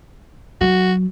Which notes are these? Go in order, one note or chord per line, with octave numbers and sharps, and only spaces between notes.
F#3 F#4